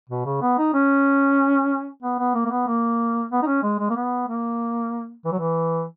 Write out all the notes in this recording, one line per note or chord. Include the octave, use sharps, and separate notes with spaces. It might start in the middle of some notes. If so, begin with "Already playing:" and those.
B2
C#3
B3
D#4
C#4
B3
B3
A#3
A#3
B3
A#3
B3
D#4
C#4
G#3
G#3
A#3
B3
A#3
E3
F#3
E3